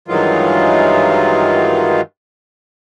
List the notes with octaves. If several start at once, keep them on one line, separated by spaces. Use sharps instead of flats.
G2 D#3 E3 F#3 G#3 F4